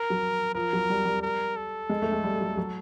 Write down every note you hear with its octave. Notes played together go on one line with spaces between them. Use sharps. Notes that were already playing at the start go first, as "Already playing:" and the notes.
Already playing: A#4
F#3
F3 A#4
F#3
G3
G3
A#4
A4
G#3
A3
G#3
G3
F#3
F#3